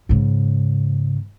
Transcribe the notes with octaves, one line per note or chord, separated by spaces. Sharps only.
G#2 C#3